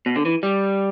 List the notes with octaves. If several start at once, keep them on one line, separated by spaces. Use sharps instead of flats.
B2
D3
E3
G3